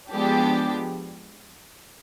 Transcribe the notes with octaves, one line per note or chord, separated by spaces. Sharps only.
F3 G#3 B3 D4 G4